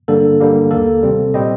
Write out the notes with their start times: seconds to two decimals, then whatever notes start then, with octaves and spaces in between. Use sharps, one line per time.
0.08 G2 D3 G3 A#3 A4
0.40 G2 D3 G3 A#3
0.71 D#2 D#3 A#3 A4
1.03 C2 C3 G3 C4
1.34 A#2 G3 C4 D#5